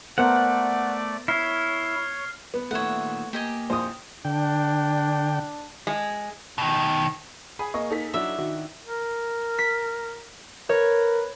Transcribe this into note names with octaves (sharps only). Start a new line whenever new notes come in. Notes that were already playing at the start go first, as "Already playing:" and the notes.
A3 B3 A#4 C5 D5 F#5
E4 C#5 F6 C7
B3
A#2 D#3 A3 C#5 E5 F#5
A#3 G4 D#5 G#5
A#1 C5 D#6
D3 D4 G5
G#3
B2 D#3
G#4 G#5 B5 D#6
A#3 D#5 C#6
D#4 A4 B6
F#3 D4 E4 E5
D#3 F#4
A#4
B6
A#4 B4 C#5